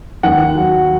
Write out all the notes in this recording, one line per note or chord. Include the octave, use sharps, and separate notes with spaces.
D#2 F#5
F#3